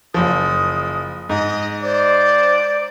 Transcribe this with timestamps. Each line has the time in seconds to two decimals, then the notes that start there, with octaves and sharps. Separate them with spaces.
0.14 F#1 F3 D#6
1.30 G#2 D#5
1.83 C5 D5